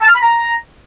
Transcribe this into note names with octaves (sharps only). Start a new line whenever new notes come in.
A5
F6
B5
A#5